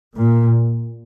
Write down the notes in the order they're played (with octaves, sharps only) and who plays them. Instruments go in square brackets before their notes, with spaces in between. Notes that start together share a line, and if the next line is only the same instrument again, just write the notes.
[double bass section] A#2